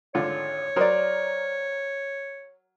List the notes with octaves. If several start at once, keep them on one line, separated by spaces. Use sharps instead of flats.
G#1 D3 F4 C#5
F#3 A#4 C5 D5 D#6